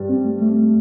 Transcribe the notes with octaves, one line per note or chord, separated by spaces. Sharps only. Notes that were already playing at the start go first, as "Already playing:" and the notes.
Already playing: G2 G3
C4
A3
A3